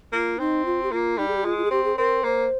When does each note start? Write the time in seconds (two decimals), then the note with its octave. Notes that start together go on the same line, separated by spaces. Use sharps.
0.12 A#3 F4
0.39 C4 D#4
0.65 F4
0.83 G4
0.92 A#3 F4
1.18 G3 D#4
1.28 G#4
1.37 G4
1.44 G#3 F4
1.58 F4
1.65 G#4
1.71 C4 G4
1.84 G#4
1.97 C4 A#4
2.24 A#3 C5